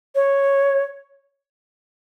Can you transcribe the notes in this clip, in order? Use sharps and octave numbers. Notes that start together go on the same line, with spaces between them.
C#5